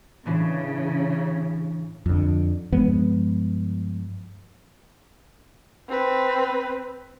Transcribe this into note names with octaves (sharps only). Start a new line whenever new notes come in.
A2 C#3 E3 D4
F2 D3
G2 F3 G#3 B3
C4 B4